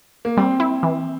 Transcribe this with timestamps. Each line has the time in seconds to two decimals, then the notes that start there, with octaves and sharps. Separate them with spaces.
0.25 A#3
0.37 G3 C4
0.60 E4
0.83 E3